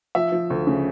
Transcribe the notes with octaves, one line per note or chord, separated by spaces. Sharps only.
F3 E5
F3
D2
C#3